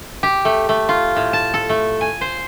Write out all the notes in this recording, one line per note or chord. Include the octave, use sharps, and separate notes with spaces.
G4
A3
A3
F4
A2
A5
A4
A3
G#5
C5